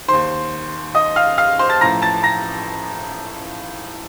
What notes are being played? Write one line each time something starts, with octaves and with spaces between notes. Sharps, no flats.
D#2 D#3 C5 C6
D#5 D#6
F5 F6
F5 F6
C5 C6
A5 A6
A1 A2 F3 A#5 A#6
A5 A6
A#5 A#6